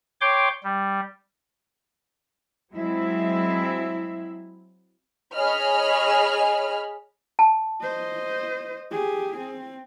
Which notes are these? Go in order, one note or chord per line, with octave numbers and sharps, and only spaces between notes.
C#5 G5 C6 D6
G3
F#3 G#3 C4 E4 E5
G#4 C#5 D#5 B5 F6
A5
C5 D#5
G4 G#4
C4